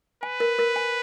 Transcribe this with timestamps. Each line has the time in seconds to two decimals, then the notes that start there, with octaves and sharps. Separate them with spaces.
0.23 B4 G#5
0.40 A#4
0.59 A#4
0.76 G#5